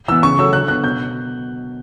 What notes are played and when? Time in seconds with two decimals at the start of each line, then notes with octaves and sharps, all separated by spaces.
0.08 E3 B3 E6
0.23 C#3 C#6
0.39 F#3 A3 E6
0.53 D3 F#6
0.68 F#3 B3 F#6
0.84 B2 G6